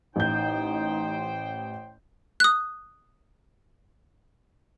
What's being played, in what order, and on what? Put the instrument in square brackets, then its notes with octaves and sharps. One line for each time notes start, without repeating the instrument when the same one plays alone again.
[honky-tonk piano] A1 G6 [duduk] D#4 [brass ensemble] C5 G5
[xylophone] D#6 F#6